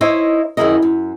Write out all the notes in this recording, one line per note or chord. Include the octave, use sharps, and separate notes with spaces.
D#4 E4 C5 C#5 D#5 E5
F#2 D#3 E4 G#4 A#4 D#5
F#2